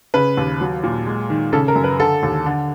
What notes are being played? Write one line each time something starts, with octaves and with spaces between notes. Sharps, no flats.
C#3 B4
D#2
F#3
A#2
G#3
D#3
C#3 A4
A#4
F#2
B4
D3 A4
D#2
D3